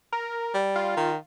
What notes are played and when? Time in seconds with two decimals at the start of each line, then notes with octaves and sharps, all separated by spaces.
0.12 A#4
0.54 G3
0.76 F4
0.97 D#3